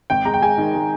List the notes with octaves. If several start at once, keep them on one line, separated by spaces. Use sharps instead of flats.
G#1 G5
G#3 A#5
G5
G#3 G#5
D#3
G#3